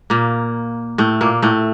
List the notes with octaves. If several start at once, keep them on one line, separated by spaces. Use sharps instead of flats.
A#2 A#3
A2 A3
A#2 A#3
A2 A3